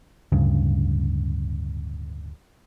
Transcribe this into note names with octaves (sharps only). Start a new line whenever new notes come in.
D1 D2 G2 C#3